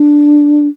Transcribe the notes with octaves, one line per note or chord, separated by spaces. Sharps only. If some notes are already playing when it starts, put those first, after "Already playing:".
Already playing: D4